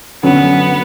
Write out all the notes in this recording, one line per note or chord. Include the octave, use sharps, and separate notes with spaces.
D3 F#3 B3 C#4